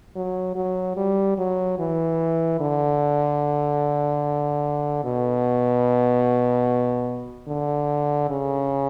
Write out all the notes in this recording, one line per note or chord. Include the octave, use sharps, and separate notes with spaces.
F#3
F#3
G3
F#3
E3
D3
B2
D3
C#3